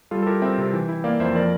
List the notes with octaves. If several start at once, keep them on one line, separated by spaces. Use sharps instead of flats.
G3 F4 A4
A4
E4 G4 A#4
C4 E5 G5
C3
E3
E4
A#3 D5 F5
F2 C5 E5
F3 A#4 D5